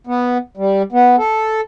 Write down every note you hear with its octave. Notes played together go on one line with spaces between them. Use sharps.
B3
G3
B3
A4